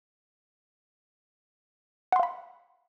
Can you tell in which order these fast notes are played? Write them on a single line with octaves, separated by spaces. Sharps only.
F#5 C6 F5 B5